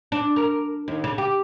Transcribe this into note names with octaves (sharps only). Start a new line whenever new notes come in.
D4
A#4
D#2
C#3
G4